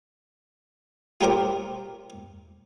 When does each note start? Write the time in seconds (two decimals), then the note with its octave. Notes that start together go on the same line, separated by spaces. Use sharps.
1.21 F4 G4 A#4 C5 D6